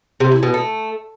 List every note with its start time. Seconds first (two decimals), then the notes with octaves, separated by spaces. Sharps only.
0.20 C3
0.32 E4
0.43 B2
0.54 A3